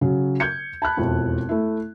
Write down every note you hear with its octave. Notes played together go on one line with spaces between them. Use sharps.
C#3 F#3
G6 G#6 C#7
A5 B5 F#6
E1 F2 E4
A3 E4